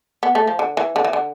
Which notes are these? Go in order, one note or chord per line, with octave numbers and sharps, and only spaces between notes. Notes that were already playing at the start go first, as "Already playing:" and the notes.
B3
A3
F3
D3
E3
D3
E3
D3